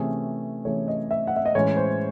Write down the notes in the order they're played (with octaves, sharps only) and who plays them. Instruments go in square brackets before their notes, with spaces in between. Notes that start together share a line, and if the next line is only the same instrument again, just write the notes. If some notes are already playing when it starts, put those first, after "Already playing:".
Already playing: [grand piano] C3 E3 A3 C#4 G#4
[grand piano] C3 E3 A3 C#4 G#4 [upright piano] C#5
[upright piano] D#5
E5
F#5
E5
D#5
[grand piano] A2 E3 G#3 C#4 [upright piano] C#5
[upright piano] C5